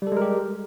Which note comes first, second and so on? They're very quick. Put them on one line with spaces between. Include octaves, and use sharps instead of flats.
G3 A4 G#3 A#4 G4